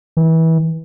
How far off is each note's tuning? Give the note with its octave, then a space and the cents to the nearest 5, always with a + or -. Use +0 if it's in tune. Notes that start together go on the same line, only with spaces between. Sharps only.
E3 -25